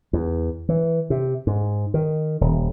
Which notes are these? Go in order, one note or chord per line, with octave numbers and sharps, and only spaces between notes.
E2
E3
C3
G#2
D#3
D#1